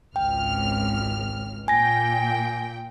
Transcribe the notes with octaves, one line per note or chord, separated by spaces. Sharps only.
G#1 C#2 G5 F6
A#2 G5 G#5 A#6